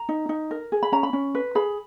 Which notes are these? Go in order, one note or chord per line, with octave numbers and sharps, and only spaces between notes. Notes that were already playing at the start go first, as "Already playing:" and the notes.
Already playing: A#5
D#4
D#4
A#4
G#4
B5
C#4 A#5
B5
C#4
B4
G#4 B5